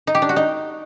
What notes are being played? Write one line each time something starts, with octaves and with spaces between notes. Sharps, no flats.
D#4
G4
D4
F#4
D#4